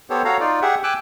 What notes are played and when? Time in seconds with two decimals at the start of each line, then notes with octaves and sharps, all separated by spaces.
0.10 B3 G4 A4 C5 C#5
0.24 F#4 A4 C#5 F5 A#5
0.40 D#4 F4 D5
0.62 G4 G#4 E5 F#5
0.83 G5 G#5 D6 E6 F#6